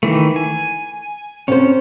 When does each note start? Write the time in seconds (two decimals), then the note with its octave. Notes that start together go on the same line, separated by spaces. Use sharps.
0.03 D#3 E3 A3
0.36 G#5
1.48 C3 C#4 C5